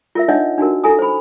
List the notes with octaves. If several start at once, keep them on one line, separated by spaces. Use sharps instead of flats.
F4 A#4 E5
D4 D#4 C#5 D#5 E5 F#5
D4 D#4 F#4 A#4
E4 A4 G#5 A#5 D#6
C5 B5